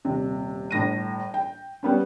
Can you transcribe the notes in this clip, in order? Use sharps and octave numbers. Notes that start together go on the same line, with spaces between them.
D#1 C3
G1 A2 A#6 D#7
G5
G3 B3 C#4